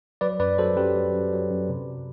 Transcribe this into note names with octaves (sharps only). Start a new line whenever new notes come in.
F#3 B4 D5
F#2 B4 D5
F#3 A4 C5
F#2 G4 B4
F#3
F#2
F#3
F#2
C3